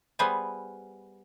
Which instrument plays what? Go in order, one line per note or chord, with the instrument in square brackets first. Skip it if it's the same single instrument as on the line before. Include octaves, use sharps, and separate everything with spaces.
[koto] G3 B3 G#4 B4 C5 G#5